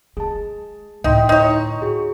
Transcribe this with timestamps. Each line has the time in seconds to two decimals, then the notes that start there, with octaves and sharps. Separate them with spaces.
0.17 G#3 G#4 A5
1.04 D2 A2 D#4 E5 G5 C6
1.29 D#4 C#5 D#5 A#5 C#6
1.82 F#4 G#4